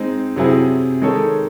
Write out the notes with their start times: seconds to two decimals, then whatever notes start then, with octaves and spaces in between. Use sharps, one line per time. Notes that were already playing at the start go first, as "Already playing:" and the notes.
Already playing: G#3 C4 D#4
0.36 C3 F#3 C4 E4 G#4
1.02 D#3 G#3 D#4 A4 C#5